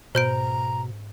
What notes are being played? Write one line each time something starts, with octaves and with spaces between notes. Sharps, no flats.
G#2 B2 C5 A#5 G6 D7